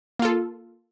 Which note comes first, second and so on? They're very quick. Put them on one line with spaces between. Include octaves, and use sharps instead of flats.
A#3 F4 A4